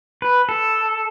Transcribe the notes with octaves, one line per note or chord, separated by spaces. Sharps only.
B4
A4